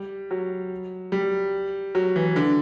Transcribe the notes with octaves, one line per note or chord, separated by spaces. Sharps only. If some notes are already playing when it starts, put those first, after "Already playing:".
Already playing: G3
F#3
G3
F#3
E3
D3